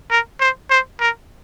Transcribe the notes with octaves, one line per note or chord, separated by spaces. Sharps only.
A#4
C5
C5
A#4